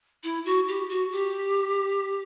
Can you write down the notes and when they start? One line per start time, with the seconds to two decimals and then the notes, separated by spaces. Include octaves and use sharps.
0.24 E4
0.45 F#4
0.68 G4
0.89 F#4
1.12 G4